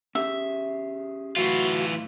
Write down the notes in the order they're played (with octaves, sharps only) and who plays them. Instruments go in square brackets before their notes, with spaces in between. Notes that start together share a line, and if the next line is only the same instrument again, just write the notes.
[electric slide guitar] C#4 G4 G#4 [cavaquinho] E5
[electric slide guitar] A2 F#3 F5 [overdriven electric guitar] E3 F4 [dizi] F#4